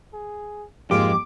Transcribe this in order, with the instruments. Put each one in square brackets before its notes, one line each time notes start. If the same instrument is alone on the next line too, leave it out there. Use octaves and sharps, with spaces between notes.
[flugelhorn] G#4
[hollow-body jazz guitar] F2 G4 [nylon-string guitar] G#2 G#3 A#3 [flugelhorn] F4 [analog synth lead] D6